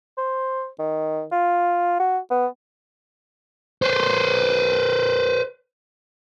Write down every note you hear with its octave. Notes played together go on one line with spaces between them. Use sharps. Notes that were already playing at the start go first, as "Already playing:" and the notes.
C5
D#3
F4
F#4
B3
B4 C5